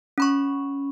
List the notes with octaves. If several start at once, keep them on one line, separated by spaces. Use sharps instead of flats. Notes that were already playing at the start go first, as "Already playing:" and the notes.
C#4 B5 C#6